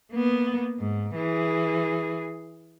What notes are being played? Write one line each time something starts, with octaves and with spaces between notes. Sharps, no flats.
A#3 B3
G#2
E3 G#4